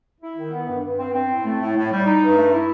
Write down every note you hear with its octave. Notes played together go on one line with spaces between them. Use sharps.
E4
D#3
B3
G2
G2
C4
C4
A2
A3
A2
A2
G3
D#4
G2
A3
E4